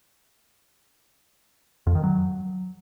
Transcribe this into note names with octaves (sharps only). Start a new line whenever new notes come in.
F2
D#3
F#3